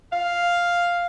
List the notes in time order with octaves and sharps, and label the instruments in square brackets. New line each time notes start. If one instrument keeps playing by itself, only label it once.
[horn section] F5